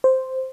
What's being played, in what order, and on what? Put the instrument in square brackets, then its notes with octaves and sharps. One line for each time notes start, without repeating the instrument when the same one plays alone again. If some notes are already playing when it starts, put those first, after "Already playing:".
[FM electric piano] C5